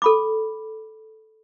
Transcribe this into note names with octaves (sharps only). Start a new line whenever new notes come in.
A4 B5 D6